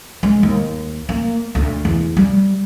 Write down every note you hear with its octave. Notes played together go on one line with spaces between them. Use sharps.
G#3
D#2
A#3
D2
E2
G3